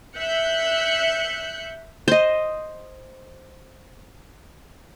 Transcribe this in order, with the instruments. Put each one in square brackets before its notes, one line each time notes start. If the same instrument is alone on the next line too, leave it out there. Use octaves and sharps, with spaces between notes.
[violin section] E5 F#6 G6 C#7
[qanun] C5 D#5